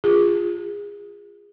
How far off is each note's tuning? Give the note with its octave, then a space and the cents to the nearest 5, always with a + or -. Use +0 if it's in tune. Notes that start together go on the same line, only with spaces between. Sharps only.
F4 +0 G#4 -25